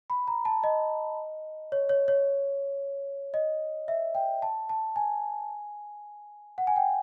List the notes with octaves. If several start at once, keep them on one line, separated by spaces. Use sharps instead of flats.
B5
A#5
A5
D#5
C#5
C#5
C#5
D#5
E5
G5
A5
A5
G#5
F#5
G#5
G5